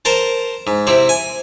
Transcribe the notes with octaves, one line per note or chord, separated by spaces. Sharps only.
A#4 C5 A5
G#2
C3 C4 E4
G#5